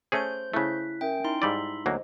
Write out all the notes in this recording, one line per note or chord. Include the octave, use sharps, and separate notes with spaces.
A3 C#4 G#4 C5 G6
C#3 A3 E4 F#6 B6
C#4 A#4 E5 G5
D#4 E4 C6
G#2 G3 D5 E6 B6 F#7
D2 F#3 A#3 C5 D#5